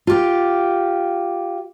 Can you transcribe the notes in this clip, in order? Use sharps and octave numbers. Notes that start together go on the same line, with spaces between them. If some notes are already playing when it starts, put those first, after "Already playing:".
F4 G4